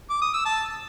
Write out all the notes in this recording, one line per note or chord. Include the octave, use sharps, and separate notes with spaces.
D6
D#6
E6
A5